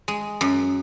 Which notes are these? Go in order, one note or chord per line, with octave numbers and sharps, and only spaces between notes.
G#3
F#2